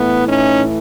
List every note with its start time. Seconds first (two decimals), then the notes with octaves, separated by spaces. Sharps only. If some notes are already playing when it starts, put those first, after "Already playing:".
Already playing: A2 E3 A3 B3
0.27 C#4 D#4